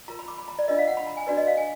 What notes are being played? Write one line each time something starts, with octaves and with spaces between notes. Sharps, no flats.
F4 A#4 A#5
B5
D6
B5
A#5
D5
D4 F4 A#4 D#5
F5
F#5
B5
A#5
G#5
D4 F#4 B4 D5
D#5
F5
G#5